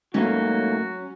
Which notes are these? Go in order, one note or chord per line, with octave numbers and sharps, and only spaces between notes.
G#2 F#3 A3 A#3 C#4 F#4